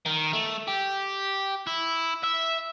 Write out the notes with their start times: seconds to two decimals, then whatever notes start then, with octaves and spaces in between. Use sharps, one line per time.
0.06 D#3
0.33 A3
0.68 G4
1.67 E4
2.24 E5